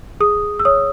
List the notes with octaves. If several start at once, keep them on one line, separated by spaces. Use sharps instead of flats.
G#4 D#6
E6
C#5 D#6